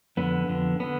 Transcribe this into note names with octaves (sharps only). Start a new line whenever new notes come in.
F2 D3 B3
F2 D3
D3 B3